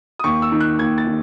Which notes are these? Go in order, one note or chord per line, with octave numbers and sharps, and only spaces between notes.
D#6
D#2 C#6
E6
D#3
F#6
D#2 G#6
A6
D#3